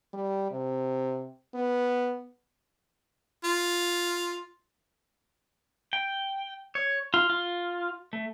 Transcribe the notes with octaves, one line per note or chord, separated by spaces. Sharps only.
G3
C3
B3
F4
G5
C#5
F4
F4
A3